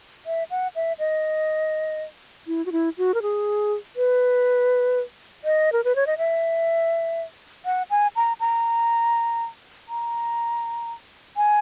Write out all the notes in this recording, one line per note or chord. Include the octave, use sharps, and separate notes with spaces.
E5
F#5
E5
D#5
E4
F#4
E4
F#4
A#4
G#4
B4
D#5
A#4
B4
C#5
D#5
E5
F#5
G#5
A#5
A#5
A#5
G#5